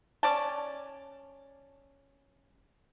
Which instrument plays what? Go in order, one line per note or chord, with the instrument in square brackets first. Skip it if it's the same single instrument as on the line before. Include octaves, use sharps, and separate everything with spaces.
[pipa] C#4 D5 A5